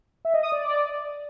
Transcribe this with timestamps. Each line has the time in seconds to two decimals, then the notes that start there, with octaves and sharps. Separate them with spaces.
0.25 E5
0.34 D#5
0.43 D#6
0.52 D5